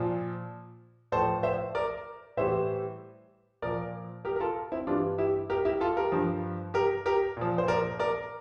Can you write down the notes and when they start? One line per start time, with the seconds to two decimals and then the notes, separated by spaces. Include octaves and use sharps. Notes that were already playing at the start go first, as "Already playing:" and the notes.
Already playing: A#2 F3
1.12 A2 F3 A4 C5
1.43 C5 E5
1.75 A#4 D5
2.37 A2 E3 G3 C5 E5
3.62 A#2 F3 A#4 D5
4.25 G4 A#4
4.36 A#4
4.40 F4 A4
4.72 C4 E4
4.87 G2 E3 G3 D4 F4
5.18 E4 G4
5.50 G4 A#4
5.65 E4 G4
5.81 F4 A4
5.97 G4 A#4
6.12 G2 F3
6.74 G4 A#4
7.06 G4 A#4
7.37 A#2 F3
7.58 C5
7.68 A#4 D5
7.99 A#4 D5